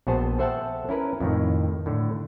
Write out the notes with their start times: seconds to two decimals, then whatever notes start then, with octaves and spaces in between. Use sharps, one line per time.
0.07 A#1 B3 F#4 G#4 C5 A5
0.39 A4 C5 E5 F#5 G5 A5
0.89 C#4 E4 A#4 B4
1.20 F2 A2 D#3
1.86 A2 D3